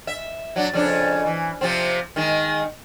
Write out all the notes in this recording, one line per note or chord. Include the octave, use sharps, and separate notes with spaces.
E5
F#3 D4
F2 C#3 D4
E3
C3 F3 C4
D#3 G#3